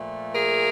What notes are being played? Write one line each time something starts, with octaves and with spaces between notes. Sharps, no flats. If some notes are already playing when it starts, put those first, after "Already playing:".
Already playing: A#2 F3 A3
G#4 A#4